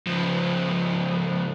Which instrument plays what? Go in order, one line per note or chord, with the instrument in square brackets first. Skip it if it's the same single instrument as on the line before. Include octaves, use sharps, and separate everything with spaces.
[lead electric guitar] C#2 F3